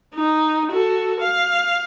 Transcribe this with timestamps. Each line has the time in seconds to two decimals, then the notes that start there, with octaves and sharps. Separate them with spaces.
0.15 D#4
0.72 F#4 A4
1.21 F5